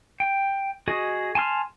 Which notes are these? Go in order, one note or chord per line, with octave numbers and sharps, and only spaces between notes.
G5
F#4 G#4 D#5
G#5 A5 C6 F6